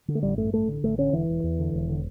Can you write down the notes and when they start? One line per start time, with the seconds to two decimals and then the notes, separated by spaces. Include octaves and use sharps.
0.08 D3
0.15 A3
0.23 A1 G3
0.38 G2 A3
0.53 A1 A3
0.68 D3
0.83 A1 A3
0.98 D3 C#4
1.13 E1 E3
1.29 E1
1.44 E2
1.59 D3
1.73 E1
1.89 D3